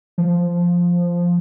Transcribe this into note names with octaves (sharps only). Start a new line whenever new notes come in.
F3